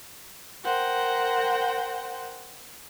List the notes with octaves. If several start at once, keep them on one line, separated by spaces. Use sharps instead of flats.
A#4 C5 F#5 G5